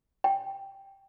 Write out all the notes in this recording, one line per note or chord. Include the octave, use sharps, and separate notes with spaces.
G5